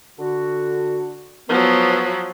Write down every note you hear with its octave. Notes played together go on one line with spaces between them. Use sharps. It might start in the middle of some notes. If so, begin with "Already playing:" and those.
D3 F#4
F3 F#3 B3